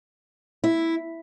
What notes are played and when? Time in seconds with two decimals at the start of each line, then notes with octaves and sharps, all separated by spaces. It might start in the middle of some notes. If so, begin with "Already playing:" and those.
0.64 E4